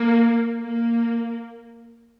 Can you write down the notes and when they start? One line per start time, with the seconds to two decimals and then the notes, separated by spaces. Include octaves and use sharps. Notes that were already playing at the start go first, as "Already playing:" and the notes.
Already playing: A#3
0.62 A#3